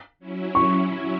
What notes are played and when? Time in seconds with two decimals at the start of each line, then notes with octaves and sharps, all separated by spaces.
0.19 F#3 C#4 E4
0.55 C#6